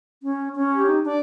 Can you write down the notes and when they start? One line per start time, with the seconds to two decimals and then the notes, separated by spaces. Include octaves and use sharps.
0.23 C#4
0.55 C#4
0.73 G4
0.86 D#4
1.06 D4 D5